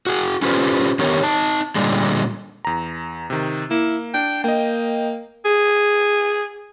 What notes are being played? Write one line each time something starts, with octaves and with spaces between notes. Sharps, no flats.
F#4 G#4
C#4 F4 G4 A4 B4 C5
D3 D#3 B3 G4 A#4 C#5
D#4 A5
A#2 D3 G3 G#3
E2 A#5
C3 D#3
A#3 E4
D4 G5
A#3 D#5 G5
G#4